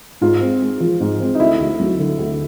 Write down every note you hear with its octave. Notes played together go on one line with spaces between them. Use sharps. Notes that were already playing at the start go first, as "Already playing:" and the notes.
G#2 F4
C4
G#3
F3
G#2
C4
D#4
D2 E4
D2
F#3
D3
D2